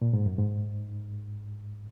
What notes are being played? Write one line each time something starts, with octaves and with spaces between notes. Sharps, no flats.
A#2
G#2
F#2
G#2